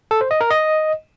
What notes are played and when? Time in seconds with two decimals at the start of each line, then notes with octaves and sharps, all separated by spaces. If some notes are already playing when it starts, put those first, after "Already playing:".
0.11 A4
0.21 C5
0.31 D#5
0.41 A#4
0.50 D#5